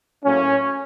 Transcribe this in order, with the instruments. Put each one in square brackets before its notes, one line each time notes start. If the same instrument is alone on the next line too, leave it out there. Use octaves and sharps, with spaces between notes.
[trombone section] A2 F#3 A#3 C#4